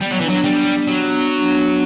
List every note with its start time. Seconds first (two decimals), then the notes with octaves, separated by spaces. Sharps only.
0.01 G3 B3
0.11 F#3
0.20 E3 D4
0.29 F#3
0.44 G3 B3
0.66 D4
0.88 F#3 D4
1.09 B3
1.30 D4
1.52 B3